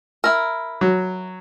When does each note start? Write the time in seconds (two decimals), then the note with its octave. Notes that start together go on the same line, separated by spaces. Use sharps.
0.24 E4 A#4
0.81 F#3